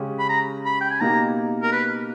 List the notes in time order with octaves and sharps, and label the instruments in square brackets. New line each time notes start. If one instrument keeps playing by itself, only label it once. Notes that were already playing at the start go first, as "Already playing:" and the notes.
Already playing: [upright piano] C#3 G#3 C#4 G4
[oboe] B5
A#5
B5
G5
G#5
[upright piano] B2 A#3 D#4 G4 [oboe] A#5
[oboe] A#4
B4